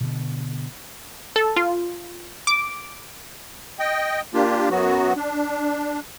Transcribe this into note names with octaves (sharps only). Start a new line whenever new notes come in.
B2 D3 B3
A4
F4
D6
D#5 G5
A#3 D4 F4 G4
F#2 F#3 B3 F#4
D4